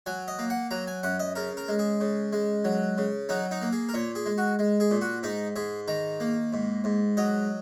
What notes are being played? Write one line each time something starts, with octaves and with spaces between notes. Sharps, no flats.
F#3 G#5
D#5
A#3
F#5
F#3 A#5
G#5
F#2 F#5
D#5
C#3 A#4
A#4
G#3
G#4
C#3
G#3
F#3
C#3
F#3 D#4
D#4
A#3
G#4
A#4
A#2 C#5
G#4
G#3
F#4
G#3
G#4
A#2
F#4
G#2 D#4
G#2 G#4
D#3 A#5
A#3
G#2
G#2
F#3 D#5